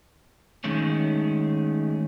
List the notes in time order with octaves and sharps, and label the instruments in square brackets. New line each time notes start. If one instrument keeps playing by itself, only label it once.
[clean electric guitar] D#3 G#3 A3 C#4